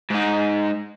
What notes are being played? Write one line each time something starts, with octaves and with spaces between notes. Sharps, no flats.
G#2 D#4